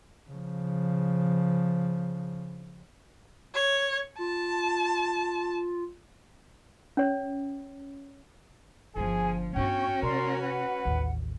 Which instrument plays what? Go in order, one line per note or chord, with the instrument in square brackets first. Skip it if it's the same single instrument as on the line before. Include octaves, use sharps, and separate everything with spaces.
[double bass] C#3 F3
[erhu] C#5
[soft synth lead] F4 [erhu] A5
[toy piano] C#4 C#5
[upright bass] G1 D3 [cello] F3 [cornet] G#4 [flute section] G#5
[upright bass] G2 B3 [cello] C#4 F#4 [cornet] G5 [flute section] C#6
[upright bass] C3 [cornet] A#4 [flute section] D5 C6
[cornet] B4 [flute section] F#5
[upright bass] A1 D#2